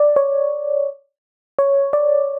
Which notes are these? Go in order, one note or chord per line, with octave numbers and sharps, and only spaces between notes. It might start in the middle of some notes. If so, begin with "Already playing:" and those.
Already playing: D5
C#5
C#5
D5